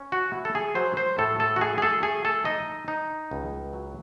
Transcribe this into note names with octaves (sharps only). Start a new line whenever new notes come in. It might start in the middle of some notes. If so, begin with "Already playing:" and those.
Already playing: C#4
F#4
E4
A4
G#4
F#3 C5
C5
A2 A4
A4
F#4
A3 G#4
G#4
A4
A3 G#4
A4
D#4 D#5
D#4
C#2
F#3